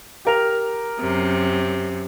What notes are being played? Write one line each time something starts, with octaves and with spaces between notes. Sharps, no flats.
G4 A#4 F7
F#2 C3